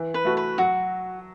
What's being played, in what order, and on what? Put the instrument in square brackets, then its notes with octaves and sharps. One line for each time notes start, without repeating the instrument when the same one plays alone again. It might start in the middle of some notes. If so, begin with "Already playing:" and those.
Already playing: [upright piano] E3
[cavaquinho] B4
[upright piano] A3 F#4
[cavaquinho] B4
[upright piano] F#3 [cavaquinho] F#4